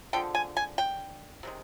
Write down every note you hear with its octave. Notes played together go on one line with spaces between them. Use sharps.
D3 F3 G#3 G5
G#5
G#5
G5
C3 D#3 G#3